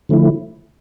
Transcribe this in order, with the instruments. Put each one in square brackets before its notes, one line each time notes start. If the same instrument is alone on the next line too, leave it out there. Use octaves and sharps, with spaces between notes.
[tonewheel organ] D3 F3 A3 E4